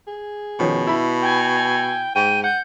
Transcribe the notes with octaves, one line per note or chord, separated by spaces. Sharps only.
G#4
B2 D#3 F3 C#4
E4 B5
G5 G#5
G#2 G5 D#7
F#5 G6